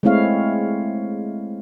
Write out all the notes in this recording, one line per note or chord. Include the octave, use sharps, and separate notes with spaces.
G#3 A3 C4 E4 C#5 F5